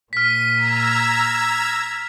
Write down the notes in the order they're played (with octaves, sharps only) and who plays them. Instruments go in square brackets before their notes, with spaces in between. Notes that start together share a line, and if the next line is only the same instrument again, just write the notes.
[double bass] A#2 [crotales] F6 B6 [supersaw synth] D#7
[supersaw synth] A#5 E6 G#6